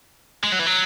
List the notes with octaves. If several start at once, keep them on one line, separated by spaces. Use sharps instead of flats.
G#3
F#3
E3
F#3